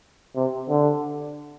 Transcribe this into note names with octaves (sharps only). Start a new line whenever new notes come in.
C3
D3